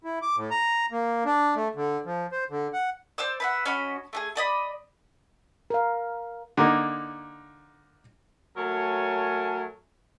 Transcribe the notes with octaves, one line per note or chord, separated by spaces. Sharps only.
E4
D6
A2
A#5
A#3
D4
A3
D3
F3
C5
D3
F#5
C5 D5 E6
B4 E5 F#5
C#4 F#4 D#5 B5
A3 D4 G#4
A4 D5 D#5 B5
A#4 F5
D3 A#3 D#4
F#3 A3 A#4 C#5 G#5 A5